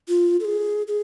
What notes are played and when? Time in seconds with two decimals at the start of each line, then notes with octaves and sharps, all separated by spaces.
0.08 F4
0.40 A4
0.45 G#4
0.88 G#4